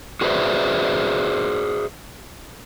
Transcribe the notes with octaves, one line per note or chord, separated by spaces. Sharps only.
F#4 G#4 B4 C5 D5 E5